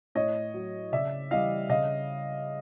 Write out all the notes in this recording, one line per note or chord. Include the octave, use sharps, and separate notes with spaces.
A2 C#5 D#5
F#3
C#3 D5 E5
E3 G3 D#5 F5
C#3 D#5 F5